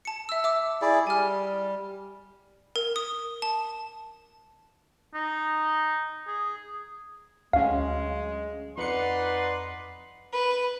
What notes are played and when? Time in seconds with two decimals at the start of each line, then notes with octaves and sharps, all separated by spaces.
0.05 A5 C#7
0.29 E5 E6
0.44 E5 D6 E6
0.82 E4 G#4 D5
1.07 G3 G#5 F6
2.76 A#4
2.96 D#6
3.42 A5
5.14 D#4
6.27 G#4
7.53 D2 F#3 G#3 C#4 F5
8.77 F2 D#4 B4 D5 F#5 C6 C#7
10.33 B4